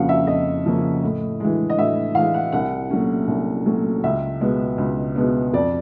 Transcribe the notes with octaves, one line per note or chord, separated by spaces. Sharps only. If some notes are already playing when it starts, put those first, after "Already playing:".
Already playing: F2 C#3 F3 A#3 C#4 F5 F#5
E5
F2 D#5
C#3 F3 A#3 C#4
A2
E3 G#3
D#5
A2 E5
E3 G#3 F5
F#5
C2 F#5
A#2 F#3 A3 C#4
C2
A#2 F#3 A3 C#4
C#2 E5
B2 G#3 B3
C#2
B2 G#3 B3
F2 D5